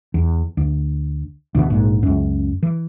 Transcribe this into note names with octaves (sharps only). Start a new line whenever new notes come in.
E2
D2
D2 B2 E3
A#1 G#2
C#2 F#2
E3